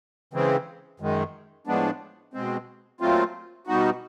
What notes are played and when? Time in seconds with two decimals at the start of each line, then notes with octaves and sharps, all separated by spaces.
0.33 C#3 E3 G#3 C4
1.00 F#2 D#3 G#3
1.67 A2 F3 G#3 B3 D4
2.34 B2 G#3 C4
3.00 A#2 F#3 A3 C4 F4
3.67 B2 G3 B3 D#4 F#4